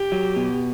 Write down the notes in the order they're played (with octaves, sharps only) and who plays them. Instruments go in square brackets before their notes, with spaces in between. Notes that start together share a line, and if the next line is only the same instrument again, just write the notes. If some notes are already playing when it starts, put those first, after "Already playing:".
Already playing: [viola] G4
[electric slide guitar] F#3
B2